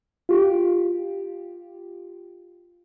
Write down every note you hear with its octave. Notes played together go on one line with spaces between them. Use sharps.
F4 G4